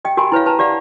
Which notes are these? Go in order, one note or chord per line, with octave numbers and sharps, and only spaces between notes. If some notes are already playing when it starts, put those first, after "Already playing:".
G4 D#5 G5
F#4 G4 A#4 D#5 G#5 B5
E4 B4 C#5 F5
G4 B4 A5 A#5
G4 D5 F5 F#5